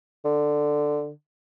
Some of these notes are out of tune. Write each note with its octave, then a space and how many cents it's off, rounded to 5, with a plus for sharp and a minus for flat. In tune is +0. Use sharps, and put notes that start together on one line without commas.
D3 +10